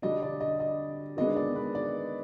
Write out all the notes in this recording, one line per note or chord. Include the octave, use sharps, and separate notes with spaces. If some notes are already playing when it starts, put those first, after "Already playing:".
D3 G3 D4 D#5
D5
D#5
D#5
D#3 G#3 B3 D4 D#5
D5
B4
D5